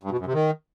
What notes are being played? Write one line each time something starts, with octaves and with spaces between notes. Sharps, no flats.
G2
B2
F#2
C3
D#3